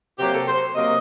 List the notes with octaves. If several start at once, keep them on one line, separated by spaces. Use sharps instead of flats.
C3 F#3 A#3 G4
A4
C5
C3 F#3 A#3 D#5